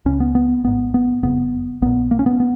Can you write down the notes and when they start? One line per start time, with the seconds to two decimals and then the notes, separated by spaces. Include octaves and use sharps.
0.05 C#2 C#3 C#4
0.20 B3
0.35 B3
0.64 G#1 G#2 B3
0.94 B3
1.23 F#1 F2 C#3 B3
1.82 A#1 A#2 B3
2.11 A#3
2.19 C#4
2.26 B3
2.40 B3